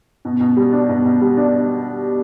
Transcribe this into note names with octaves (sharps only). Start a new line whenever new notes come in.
B2
B2
G3
D4
B2
B2
G3
D4